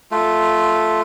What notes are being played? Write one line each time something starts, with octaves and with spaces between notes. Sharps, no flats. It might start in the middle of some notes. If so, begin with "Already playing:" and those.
A3 F4